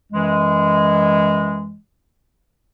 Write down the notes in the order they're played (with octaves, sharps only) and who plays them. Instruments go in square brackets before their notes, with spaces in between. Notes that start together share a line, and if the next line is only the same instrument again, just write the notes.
[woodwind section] F#2 E3 G#3